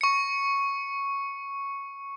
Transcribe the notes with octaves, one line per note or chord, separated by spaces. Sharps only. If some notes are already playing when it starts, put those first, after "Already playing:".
C#6 C#7